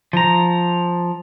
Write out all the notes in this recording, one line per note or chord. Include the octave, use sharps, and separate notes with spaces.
F3 A#5